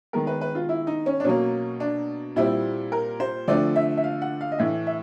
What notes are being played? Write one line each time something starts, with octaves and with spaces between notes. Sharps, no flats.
D#3 G#3 B3 A#4
B4
B4
F4
E4
D#4
C#4
D4
B2 F#3 A#3 C#4
D4
A#2 G3 C4 E4
A#4
C5
D3 F3 A3 C4 D5
E5
E5
F5
F#5
F5
D#5
A2 E3 A3 E5
E5